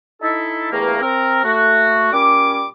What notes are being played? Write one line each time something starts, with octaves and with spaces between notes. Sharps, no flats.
D#4 E4 A4
E2 G2 A3 A#3
C4 A#4
A3 F#4
A#2 G3 C#4 D6